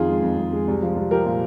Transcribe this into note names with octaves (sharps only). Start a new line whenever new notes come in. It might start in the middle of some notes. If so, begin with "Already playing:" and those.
Already playing: F2 D#3 F4 G#4
G#3
F2
F2
G#3
C2
F3
C2
F3 G4 A#4
A#2